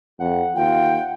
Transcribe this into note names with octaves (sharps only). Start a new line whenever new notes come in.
F2 F#5
D#2 F4 G5